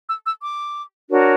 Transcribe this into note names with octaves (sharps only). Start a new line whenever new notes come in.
E6
E6
D6
D4 F#4 A#4 C#5